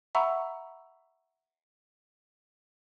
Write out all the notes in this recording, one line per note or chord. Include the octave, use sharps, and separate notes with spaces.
E5 F#5 A#5 B5 C#6 E6